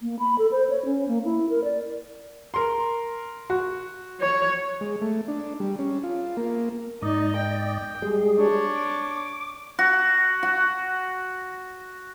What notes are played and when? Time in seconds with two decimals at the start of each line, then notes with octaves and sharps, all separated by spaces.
0.01 A#3
0.19 B5
0.39 A4
0.52 C5
0.70 C#5
0.86 C#4
1.08 A#3
1.25 E4
1.49 A#4
1.64 D5
2.54 A#4 C6
3.50 F#4
4.21 C#5
4.81 G#3
5.01 A3
5.28 D4
5.60 G3
5.79 C#4
6.03 F4
6.37 A#3
7.02 G#2 D#4 D5 D#5
7.36 G5
8.02 G3 G#3 G#4
8.36 D4 C#5
8.76 D6
9.79 F#4
10.43 F#4